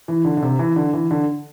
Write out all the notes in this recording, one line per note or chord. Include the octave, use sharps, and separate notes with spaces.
E3
D3
D3
C3
E3
D3
E3
D3